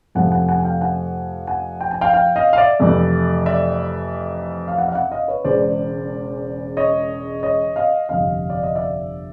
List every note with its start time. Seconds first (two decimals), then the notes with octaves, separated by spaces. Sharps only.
0.15 F2 C3 F3 A3 F#5 G#5
0.32 F#5 G#5
0.48 F#5 G#5
0.59 G#5
0.65 F5 G5
0.81 F#5 G#5
1.47 F#5 G#5
1.81 G5
1.91 G#5
2.01 F5 G5
2.13 F5 G5
2.36 D#5 F5
2.53 F5
2.58 D5 E5
2.80 F2 C3 E3 A3
3.46 D5 E5
4.68 F5
4.78 E5 F#5
4.88 F5
4.95 E5 F#5
5.12 D#5 F5
5.28 B4 C#5
5.44 E1 E2 C#3 E3 G#3 C5 D5
6.77 C#5 D#5
7.43 C#5 D#5
7.76 D#5 F5
8.09 G1 F2 C3 D#5 F5
8.50 D5
8.63 D#5
8.75 D5 E5